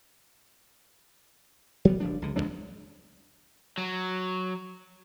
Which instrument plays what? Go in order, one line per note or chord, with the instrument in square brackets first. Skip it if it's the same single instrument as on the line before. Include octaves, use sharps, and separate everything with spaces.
[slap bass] F#3 G3 B3
F#1 F3 D4
C#2 D3
A1 F#3 G#3 D4
[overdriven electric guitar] F#3